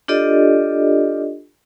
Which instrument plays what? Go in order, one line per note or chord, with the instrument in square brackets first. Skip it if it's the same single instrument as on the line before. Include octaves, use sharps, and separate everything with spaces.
[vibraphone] D4 F4 G4 A4 D5 D#5